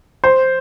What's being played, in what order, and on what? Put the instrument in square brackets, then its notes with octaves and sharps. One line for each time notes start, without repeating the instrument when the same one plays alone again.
[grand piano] C5